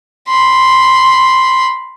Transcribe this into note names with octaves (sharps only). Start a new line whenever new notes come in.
B5 C6